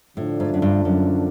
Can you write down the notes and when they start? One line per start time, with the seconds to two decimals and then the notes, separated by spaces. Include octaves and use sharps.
0.17 A2 D3 F3 A3 D4
0.40 G#2
0.54 F#2
0.62 G2
0.85 F#2